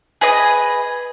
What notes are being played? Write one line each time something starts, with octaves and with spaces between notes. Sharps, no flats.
G#4 B4 D#5